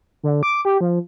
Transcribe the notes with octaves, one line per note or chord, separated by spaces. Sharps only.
D3
D6
G4
F3